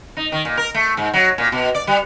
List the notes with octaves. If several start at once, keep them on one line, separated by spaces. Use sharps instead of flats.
D#4
D#3
A#2
A#4
A3
G#2
F#3
A#2
B2
D5
G3